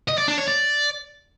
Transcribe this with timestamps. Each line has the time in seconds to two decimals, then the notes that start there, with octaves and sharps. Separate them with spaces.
0.08 D#5
0.18 D5
0.28 D4
0.38 C#5
0.48 D5